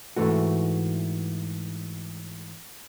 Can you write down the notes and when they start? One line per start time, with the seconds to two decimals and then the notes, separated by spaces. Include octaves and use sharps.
0.16 G#2 E3 A3 F#4